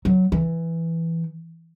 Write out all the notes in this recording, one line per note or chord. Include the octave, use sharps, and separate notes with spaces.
F#3
E3